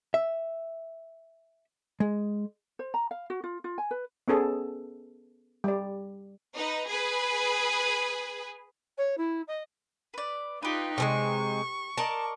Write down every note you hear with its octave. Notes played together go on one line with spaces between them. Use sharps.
E5
G#3
C5
A#5
F5
F#4
F4
F4
G#5
B4
B3 C#4 G#4 A4
G3 D5
D#4 B4
G#4 B4
C#5
E4
D#5
B4 D5
D#4 F4 G4 B4
C3 E3 G#3 C#6
A#4 D5 D#5 A5